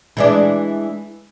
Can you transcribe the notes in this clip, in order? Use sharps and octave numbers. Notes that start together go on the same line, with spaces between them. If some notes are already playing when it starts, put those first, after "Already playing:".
E3 G#3 D4